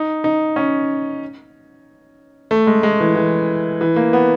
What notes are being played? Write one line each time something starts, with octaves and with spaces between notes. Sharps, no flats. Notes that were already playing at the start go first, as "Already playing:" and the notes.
Already playing: D#4
D#4
C#4
A3
G#3
G#3
E3
E3
E3
A#3
B3